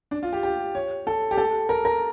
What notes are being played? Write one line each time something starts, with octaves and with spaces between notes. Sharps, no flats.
D4
F4
G4
G4
C#5
A4
G4
A4
A#4
A#4